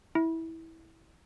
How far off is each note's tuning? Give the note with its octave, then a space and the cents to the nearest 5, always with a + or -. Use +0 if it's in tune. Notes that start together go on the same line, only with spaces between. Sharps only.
E4 -15